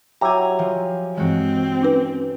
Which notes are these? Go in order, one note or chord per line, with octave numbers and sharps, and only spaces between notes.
F#3 E4 G4 G#5 A#5
F3
G2 E3 G#3 C4 F#4
C#4 D#4 B4